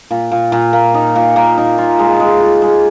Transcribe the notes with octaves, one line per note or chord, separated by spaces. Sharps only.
A#2
A#2
A#2
A#3
D#4
A#2
A#3
D#4
F4
G#3
G#3
F4
G#3